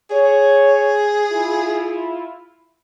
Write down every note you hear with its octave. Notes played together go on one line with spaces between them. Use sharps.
G#4 C#5
E4 F4